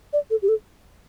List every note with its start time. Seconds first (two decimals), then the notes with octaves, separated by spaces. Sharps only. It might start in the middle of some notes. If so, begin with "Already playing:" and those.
0.13 D5
0.30 A4
0.42 G4
0.49 A4